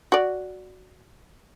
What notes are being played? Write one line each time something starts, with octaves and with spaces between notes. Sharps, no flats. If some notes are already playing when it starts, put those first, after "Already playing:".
F#4 D5